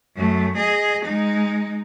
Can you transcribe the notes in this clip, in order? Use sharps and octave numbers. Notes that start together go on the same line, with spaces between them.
F#2 A3
G#4 D#5
G#3 D#4